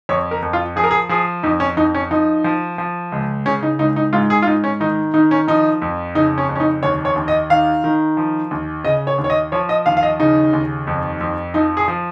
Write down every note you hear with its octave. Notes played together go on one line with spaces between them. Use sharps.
F2 C#5
A#4
F2
F4
F3 G#4
A#4
G#4
F3 G#4
F2 D#4
C#4
F2 D#4
C#4
F3 D#4
F3
F3
C#2
C#3 C#4
D#4
C#2 D#4
D#4
G#2 F4
G#4
F4
G#2 D#4
C#4
D#3 D#4
D#3 D#4
C#4
F3 D#4
F2
C#3 D#4
C#4
F2
C#4
D#4
D#2 C#5
C#5
D#2
D#5
D#3 F5
D#3
F3
D#2
C#3 D#5
C#5
D#2
C#5
D#5
F3 C#5
D#5
D#2 F5
F5
D#5
C#3 D#4
D#2
F2
F2
F3 D#4
G#4
F3